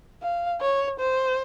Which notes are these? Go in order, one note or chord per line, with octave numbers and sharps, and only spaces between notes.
F5
C#5
C5